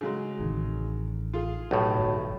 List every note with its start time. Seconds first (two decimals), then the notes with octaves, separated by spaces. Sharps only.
0.01 C#3 F#3 G#3
0.40 A1 C3 D#3
1.33 F4 G#4
1.71 B1 A2 G4
1.98 G1